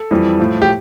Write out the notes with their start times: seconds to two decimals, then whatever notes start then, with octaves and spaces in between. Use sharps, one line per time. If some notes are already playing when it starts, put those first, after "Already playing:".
Already playing: A4
0.11 F2 E3 G3
0.39 A2 F3
0.62 G4